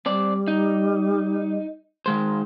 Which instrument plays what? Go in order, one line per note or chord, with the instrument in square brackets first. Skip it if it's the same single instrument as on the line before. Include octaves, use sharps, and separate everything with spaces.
[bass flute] G3 [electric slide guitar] C4 D5
[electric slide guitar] D#4
D#3 G#3 C5